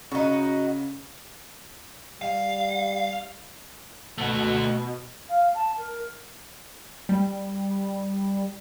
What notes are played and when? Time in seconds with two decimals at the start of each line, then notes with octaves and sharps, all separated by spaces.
0.11 C#3 D#4 F#4
2.22 G3 F5
4.18 B2 A3 F#4
5.29 F5
5.54 A5
5.78 A#4
7.09 G3